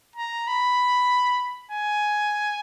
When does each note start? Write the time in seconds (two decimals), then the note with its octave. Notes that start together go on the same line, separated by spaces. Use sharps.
0.16 A#5
0.47 B5
1.71 G#5